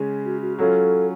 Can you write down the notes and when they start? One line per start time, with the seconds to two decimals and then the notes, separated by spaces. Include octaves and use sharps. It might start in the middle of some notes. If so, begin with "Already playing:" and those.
Already playing: C#3 G#3 C#4
0.25 F#4
0.42 F#4
0.59 F#3 C#4 F4 A4